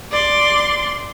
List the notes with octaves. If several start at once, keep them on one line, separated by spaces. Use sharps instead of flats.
D5 C6